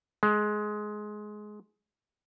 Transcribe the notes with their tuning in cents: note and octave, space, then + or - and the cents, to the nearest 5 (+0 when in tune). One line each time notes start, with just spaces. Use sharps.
G#3 +15